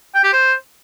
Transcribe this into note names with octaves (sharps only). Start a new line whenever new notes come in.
G5
G4
C5